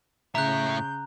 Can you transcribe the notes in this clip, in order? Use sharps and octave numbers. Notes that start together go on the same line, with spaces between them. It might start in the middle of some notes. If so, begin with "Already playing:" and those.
A2 C#3 E5 A#5 F#6 G6